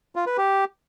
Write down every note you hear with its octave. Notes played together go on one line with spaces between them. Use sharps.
F4
B4
G4